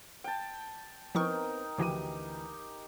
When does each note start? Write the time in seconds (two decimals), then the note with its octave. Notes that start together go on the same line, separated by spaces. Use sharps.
0.24 G5 A5
1.15 F3 B3 C4 D#4 E4 A#4 G5 C#6
1.78 D2 E3 F3 E4 F#4 G4 D#7